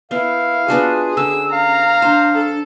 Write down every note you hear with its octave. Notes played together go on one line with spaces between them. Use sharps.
B3 E4 A#4 F5
B3 D4 F4 F#4 G#4
D3 C#4 E6
F5 A#5
D4 C5
A4